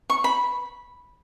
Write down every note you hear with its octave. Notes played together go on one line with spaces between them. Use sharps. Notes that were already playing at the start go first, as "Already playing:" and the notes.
C#6
B5